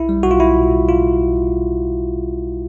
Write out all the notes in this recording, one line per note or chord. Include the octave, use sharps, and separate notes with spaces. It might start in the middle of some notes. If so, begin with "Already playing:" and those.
Already playing: B1 E4
G3
B1 F#4
F4
B1 E4
B2
B1
B1 F4
B1
B1
B1